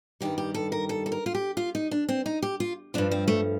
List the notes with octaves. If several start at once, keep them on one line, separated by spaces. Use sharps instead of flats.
G2 D#3 G3 G4
G4
A4
A#4
A4
A4
A#4
F4
G4
F4
D#4
D4
C4
D#4
G4
F4
G2 F3 D4
C4
A3